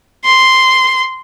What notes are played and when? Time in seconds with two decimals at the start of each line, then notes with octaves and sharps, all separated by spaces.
0.25 C6